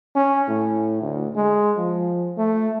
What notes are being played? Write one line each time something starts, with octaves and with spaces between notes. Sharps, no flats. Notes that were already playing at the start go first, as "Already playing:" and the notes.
C#4
A2
D2
G#3
F3
A3